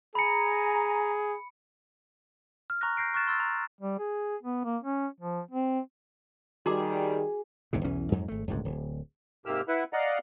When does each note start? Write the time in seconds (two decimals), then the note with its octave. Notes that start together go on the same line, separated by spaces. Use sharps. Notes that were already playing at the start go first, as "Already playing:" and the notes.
0.15 G#4 G#5 A#5 B5 C#7
2.70 F6
2.81 A#5 C#6 F6 F#6 A#6
2.97 G6 A#6 C7 D7
3.14 C#6 F6 F#6 A6 E7
3.27 C6 E6 A6
3.40 A#5
3.81 G3
3.99 G#4
4.43 B3
4.64 A#3
4.83 C#4
5.21 F3
5.51 C4
6.66 D#3 G3 F#4 G#4 A#5 D6
7.73 F#1 D#2 G#2 C3
7.84 B1 E2 E3 C#4
8.12 F2 G#2 F#3
8.28 G#1 A3
8.47 D1 G1 C#2 G#2
8.65 D1
9.46 G#2 C3 A#3 G4 E6 F6
9.68 E4 B4 E5 F#5
9.93 D5 D#5 F5 F#5 A#5